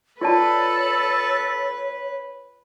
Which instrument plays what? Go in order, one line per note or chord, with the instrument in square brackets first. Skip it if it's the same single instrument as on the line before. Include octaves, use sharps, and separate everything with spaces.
[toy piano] F4 D5 A5 [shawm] A4 [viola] B4 [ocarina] C#5